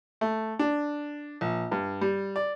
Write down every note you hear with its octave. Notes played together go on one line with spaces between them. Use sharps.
A3
D4
A#1
G2
G3
D5